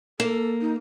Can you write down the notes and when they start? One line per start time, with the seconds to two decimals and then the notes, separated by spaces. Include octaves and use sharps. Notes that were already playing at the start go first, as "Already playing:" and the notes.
0.20 A#3 A4
0.61 D#4